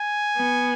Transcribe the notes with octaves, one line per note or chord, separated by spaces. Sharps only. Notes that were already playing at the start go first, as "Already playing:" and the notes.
Already playing: G#5
B3